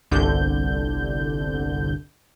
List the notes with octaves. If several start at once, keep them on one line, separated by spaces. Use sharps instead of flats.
G1 C2 D3 G6